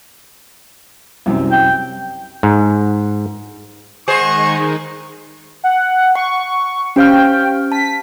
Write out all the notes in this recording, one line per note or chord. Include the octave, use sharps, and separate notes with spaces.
C2 F#2 C3
G5
G#2
D#3 G#3 D#4 G#4 C5 D#5 F#5 C#6
F#5
F#5 C#6
C#4 G4 C5 F5 G5 F6
A5 B6